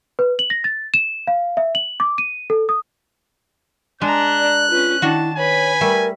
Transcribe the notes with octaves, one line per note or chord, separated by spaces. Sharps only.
B4
F#7
A#6
A6
E7
F5
E5
F#7
D6
D#7
A4
D#6
G#3 D4 A#5 F#6
D5
C#4 F4 B4
D#3 D4 E4 F#4 A5
B4 C#5 G#5 B5
G3 A3 A#4